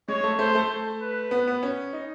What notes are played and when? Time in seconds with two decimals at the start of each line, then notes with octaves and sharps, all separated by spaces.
0.08 G#3 C#5
0.24 A3
0.39 A3 C5
0.55 A3
1.01 B4
1.31 B3
1.47 B3
1.63 C#4
1.93 D#4